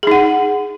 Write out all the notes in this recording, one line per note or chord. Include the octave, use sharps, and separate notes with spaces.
D#4 G#4 F#5